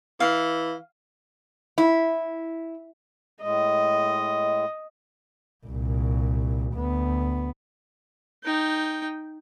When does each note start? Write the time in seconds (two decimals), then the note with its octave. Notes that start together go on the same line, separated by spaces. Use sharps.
0.20 E3 F5
1.78 E4
3.42 A2 G#3 D#5
5.66 C2 A#2
6.74 D2 B3
8.44 D#4 G5